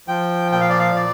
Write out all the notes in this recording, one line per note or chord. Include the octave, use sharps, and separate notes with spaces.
F3 G5
A#2 G5
F5
D5
F5
A#2 D5